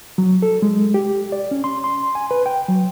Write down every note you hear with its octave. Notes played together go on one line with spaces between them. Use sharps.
F#3
A4
G#3
G4
D5
C#4
C6
C6
G#5
B4
G5
F#3